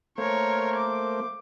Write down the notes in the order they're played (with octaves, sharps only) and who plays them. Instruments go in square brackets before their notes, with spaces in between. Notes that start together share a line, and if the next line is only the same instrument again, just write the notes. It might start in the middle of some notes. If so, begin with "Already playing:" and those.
[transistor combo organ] A3 A#3 C5 [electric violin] A#4 C#5
[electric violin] D6